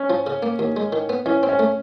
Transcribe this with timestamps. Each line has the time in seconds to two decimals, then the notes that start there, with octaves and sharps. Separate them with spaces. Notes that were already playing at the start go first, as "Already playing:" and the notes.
Already playing: C#4
0.10 F3
0.27 C#3
0.43 A#3
0.59 D#2
0.76 G#3
0.92 D#3
1.09 B3
1.26 E3 C#4
1.43 C4
1.49 C#4
1.59 A3